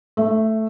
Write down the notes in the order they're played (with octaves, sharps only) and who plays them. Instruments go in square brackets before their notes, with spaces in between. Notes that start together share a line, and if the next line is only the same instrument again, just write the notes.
[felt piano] A3